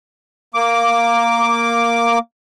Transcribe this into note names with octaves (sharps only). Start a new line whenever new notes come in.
A#3 D6